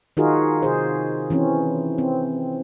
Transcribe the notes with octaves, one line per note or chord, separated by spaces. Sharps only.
D#3 D#4 F4 F#4 G#4 A#4
C3 G#4 C5
E3 C4 C#4
C4